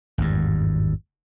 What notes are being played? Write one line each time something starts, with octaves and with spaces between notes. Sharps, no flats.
G#1 E2 G2